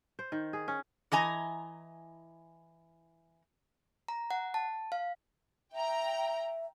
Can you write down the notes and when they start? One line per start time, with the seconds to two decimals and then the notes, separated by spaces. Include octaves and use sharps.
0.19 C5
0.32 D#3
0.53 G#4
0.68 C#4
1.12 E3 D#5 G#5 A#5
4.08 A#5
4.31 F#5
4.54 A5
4.92 F5
5.73 E5 G5 A#5